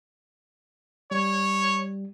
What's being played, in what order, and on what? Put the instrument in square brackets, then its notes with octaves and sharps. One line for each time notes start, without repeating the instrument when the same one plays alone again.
[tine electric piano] G3 [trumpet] C#5